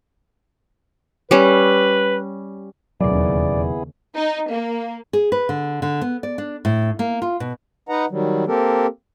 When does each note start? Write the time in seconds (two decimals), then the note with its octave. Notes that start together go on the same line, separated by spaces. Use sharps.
1.31 G3 C#4 B4
3.00 E1 D#2 C#3 F#3 B3 E4 G#4 D5
4.16 D#4
4.50 A#3
5.13 G#4
5.32 B4
5.49 D3
5.82 D3
6.01 B3
6.23 D5
6.38 D4
6.65 A2
6.99 A#3
7.22 F4
7.40 B2
7.89 D#4 B4 D#5 F#5 A#5
8.10 D#3 F#3 G3
8.47 A#3 C4 G4 A4 A#4